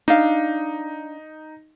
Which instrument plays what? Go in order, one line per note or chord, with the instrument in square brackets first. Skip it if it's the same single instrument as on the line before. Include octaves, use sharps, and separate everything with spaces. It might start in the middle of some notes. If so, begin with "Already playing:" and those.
[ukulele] D4 F5 [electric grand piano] D#4